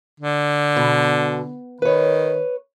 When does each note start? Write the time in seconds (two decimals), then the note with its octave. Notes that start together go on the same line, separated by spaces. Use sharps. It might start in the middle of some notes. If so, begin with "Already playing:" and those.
0.20 D3
0.76 B2
1.82 D#3 B4 C#5